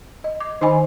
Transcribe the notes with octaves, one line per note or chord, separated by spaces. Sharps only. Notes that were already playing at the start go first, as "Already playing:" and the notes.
D#5
D6
D#3 D#4 C5 D#5 G#5 B5